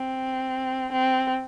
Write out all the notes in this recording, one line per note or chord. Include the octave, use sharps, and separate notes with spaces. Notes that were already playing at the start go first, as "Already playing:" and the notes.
Already playing: C4
C4